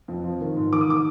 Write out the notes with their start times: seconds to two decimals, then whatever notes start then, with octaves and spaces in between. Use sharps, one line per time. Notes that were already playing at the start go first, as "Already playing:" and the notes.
0.08 F2
0.23 F3
0.41 D#3
0.56 G#2
0.72 D#3 D6
0.81 D#6
0.88 D#3 D6